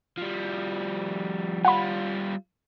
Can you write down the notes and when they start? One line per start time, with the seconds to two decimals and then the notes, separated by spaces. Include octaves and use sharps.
0.18 F3 G3
1.65 G3 F4 F#5 B5